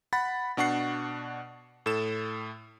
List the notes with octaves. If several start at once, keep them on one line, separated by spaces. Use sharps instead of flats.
F#5 B5 A6
B2 D4 F#5 C#6 C7
A2 A4 E7